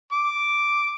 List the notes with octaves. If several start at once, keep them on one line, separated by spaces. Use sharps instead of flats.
D6